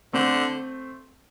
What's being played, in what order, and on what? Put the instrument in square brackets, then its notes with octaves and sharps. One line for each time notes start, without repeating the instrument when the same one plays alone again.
[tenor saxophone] D3 [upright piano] A3 C4